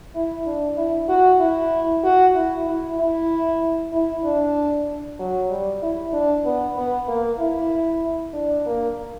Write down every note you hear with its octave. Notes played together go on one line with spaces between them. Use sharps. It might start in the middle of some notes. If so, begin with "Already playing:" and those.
E4
D4
E4
F#4
E4
F#4
E4
E4
E4
E4
D4
F#3
G3
E4
D4
B3
B3
A#3
E4
D4
A#3